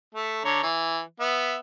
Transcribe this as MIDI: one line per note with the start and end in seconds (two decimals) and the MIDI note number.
0.15 0.44 57
0.45 0.63 50
0.45 0.63 73
0.45 0.63 82
0.63 1.00 52
1.20 1.57 59
1.20 1.57 76